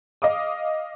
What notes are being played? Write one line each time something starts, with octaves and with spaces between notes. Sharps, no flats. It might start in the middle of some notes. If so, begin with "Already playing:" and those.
D#5 F5 D6 D#6